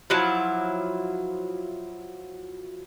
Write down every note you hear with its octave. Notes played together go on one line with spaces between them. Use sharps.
F3 F#3 E4